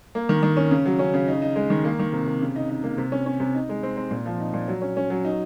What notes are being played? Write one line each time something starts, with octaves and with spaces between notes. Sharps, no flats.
A#3
D#3
D#3
C#4
C#3
F#3
C#4
C#3
D#4
D#4
G#3
D#3
A#3
D#3
C3
C3
C#3
D#4
D#4
A#3
C3
C#4
C#4
C3
D#4
G#3
C4
C4
A#2
F3
D#4
A#2
F#3
C#4
C#4
F#3
D#4